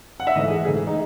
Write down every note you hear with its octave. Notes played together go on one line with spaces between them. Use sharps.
F#5
E5
G#2 E3 A3 D#5
G#4
G#2 E3 A3 G#4
D#4